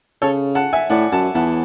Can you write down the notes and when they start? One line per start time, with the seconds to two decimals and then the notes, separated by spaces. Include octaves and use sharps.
0.22 C#3 A4 C#5
0.55 F#5 A5
0.73 E5 G#5
0.90 A2 D5 F#5
1.12 F#2 F#5 A5
1.35 E2 F#5 A5